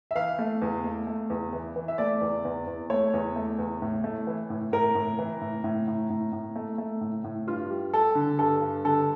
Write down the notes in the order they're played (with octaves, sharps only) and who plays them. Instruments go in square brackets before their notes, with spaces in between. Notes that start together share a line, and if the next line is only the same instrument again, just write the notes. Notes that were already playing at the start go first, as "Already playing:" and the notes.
[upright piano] E5
E3 F5
A3
E2
A3
A3
E2
E3
E3
E5
A3 D5
E2
E2
E2
A3 C#5
E2
A3
E2
A2
A3
E3
A2
A2 A#4
A2
E3
A2
A2
A2
A2
A2
A3
A3
A2
A2
G2 F4
G3
G3 A4
D3
G2 A4
G2
D3 A4